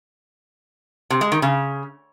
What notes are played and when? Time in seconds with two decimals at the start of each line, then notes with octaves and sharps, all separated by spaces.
1.10 C3
1.21 G#3
1.32 D#3
1.42 C#3